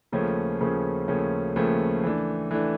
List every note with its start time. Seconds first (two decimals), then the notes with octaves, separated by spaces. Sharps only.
0.12 D#2 C#3 F3 A3 C#4
0.60 D#2 C#3 F3 A3 C#4
1.08 D#2 C#3 F3 A3 C#4
1.56 D#2 C#3 F3 A3 C#4
2.04 E3 A3 D4
2.51 E3 A3 D4